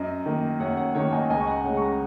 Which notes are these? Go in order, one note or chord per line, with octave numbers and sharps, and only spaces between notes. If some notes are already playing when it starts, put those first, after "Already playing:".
Already playing: F#2 D#5
D#3 A#3
F#2 C#5 F#5
C#5 F#5
D#3 A#3 C#5 F#5
D#5 G#5
C#2 D#5 G#5
C#6
F#5 A#5
C#3 G#3 C#5 F#5
C#6
F#5 A#5